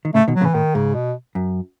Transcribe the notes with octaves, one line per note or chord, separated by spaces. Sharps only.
D#3
A2 C#3 A3
B2 D#3
F#3
A2 C#3
E3
A2 D#3
G#2 C#3
B2
F#2